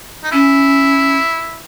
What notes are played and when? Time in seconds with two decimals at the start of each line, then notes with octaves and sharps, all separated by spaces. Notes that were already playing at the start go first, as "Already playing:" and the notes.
0.24 D#4
0.32 C#4 E4